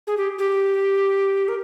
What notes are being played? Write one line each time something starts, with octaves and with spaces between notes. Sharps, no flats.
G#4
G4
G4
A#4